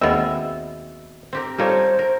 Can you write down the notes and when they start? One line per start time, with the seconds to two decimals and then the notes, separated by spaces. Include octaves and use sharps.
0.01 D#2 B2 G#3 C4 E5
1.33 C4 G4 A#4
1.59 G3 D#4 F4 A4 A#4 C5 C#5
1.99 A#4